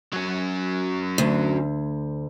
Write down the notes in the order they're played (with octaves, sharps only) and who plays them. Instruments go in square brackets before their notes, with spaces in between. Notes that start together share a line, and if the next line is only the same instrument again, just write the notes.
[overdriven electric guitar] F#3 C#4
[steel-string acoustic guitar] D2